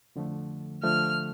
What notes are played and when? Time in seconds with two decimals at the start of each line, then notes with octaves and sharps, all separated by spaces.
0.16 F2 D3 F3 A3
0.83 D3 F3 A3 F6